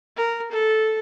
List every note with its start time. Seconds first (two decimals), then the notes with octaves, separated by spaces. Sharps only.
0.16 A#4
0.51 A4